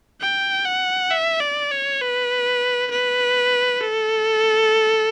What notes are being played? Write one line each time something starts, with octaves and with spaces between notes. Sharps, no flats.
G5
F#5
E5
D5
C#5
B4
B4
A4